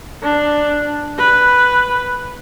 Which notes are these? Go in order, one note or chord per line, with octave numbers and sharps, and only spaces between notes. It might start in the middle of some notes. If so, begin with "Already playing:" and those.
D4
B4